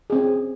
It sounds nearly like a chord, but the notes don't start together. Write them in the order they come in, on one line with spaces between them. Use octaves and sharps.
G#4 C4 C#4